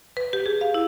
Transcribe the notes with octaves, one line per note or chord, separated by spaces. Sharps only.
B4
G4
G#4
F5
E4